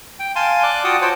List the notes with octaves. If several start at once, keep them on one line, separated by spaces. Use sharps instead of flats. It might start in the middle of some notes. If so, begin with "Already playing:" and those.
G5
F5 G#5 A5 C6
D5 D6 F#6
F4 F#4 F#5 G5 A5 D#6
C5 C#5 F#5 G5 A5